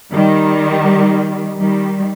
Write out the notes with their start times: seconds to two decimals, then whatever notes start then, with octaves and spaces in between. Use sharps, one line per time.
0.13 D#3 G3
1.58 D#3 G3